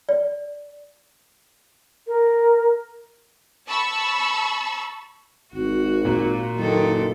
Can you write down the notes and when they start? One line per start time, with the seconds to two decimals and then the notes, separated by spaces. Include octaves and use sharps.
0.09 D5
2.07 A#4
3.68 A5 B5 C#6 E6
5.53 G#1 F#4
6.05 A#2
6.56 F#1 F#2 D#3 A4